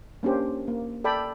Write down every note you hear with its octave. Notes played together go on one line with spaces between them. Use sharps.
A#3 C#4 D4 G4 C5
A#3
A4 D5 G5 A5 B5